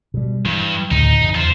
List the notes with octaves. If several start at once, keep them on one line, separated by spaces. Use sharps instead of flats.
B2 G3
G2 E3
D2 A2 C#3 D#4
E2 C#3
F4 C5